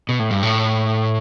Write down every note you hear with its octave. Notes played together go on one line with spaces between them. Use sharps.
B2
A2
G2
A2